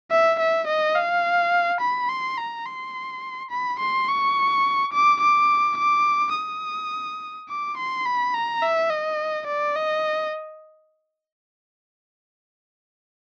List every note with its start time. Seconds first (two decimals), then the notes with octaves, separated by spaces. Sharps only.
0.11 E5
0.39 E5
0.67 D#5
0.96 F5
1.81 B5
2.09 C6
2.38 A#5
2.67 C6
3.51 B5
3.80 C6
4.08 C#6
4.93 D6
5.22 D6
5.78 D6
6.35 D#6
7.49 D6
7.78 C6
8.06 B5
8.34 A#5
8.62 E5
8.90 D#5
9.47 D5
9.76 D#5